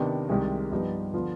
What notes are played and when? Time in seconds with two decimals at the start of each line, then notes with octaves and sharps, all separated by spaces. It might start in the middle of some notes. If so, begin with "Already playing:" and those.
Already playing: C3 D#3 B3 D4
0.29 C2 C3 D#3 G#3
0.71 G2 F3 B3 D#4 G4
1.14 D3 F3 B3 F4